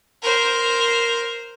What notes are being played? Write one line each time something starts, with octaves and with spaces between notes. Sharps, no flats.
A#4 C5